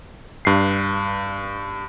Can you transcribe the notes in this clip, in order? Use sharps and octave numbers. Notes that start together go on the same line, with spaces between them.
G2 C7